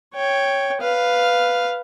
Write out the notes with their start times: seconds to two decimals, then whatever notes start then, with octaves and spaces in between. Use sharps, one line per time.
0.14 C#5 G5
0.81 B4 F5